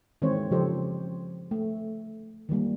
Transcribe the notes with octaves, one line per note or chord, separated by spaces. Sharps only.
D#3 E3 G#3 C4 C5 C#5
C#3 E3 F3 G4 A4 C5
A3
D#3 E3 G3 A#3